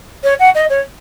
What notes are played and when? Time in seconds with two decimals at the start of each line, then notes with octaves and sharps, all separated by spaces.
0.24 C#5
0.39 F#5
0.55 D#5
0.70 C#5